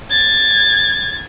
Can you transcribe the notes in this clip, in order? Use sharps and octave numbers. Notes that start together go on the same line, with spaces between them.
G#6 A6